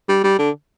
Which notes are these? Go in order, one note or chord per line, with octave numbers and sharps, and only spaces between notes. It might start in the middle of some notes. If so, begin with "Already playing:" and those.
G3
G3
D3